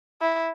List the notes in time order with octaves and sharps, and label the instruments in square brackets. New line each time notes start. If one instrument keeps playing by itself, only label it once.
[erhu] E4